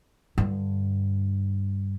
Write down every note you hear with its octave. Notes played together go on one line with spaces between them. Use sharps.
G2 D3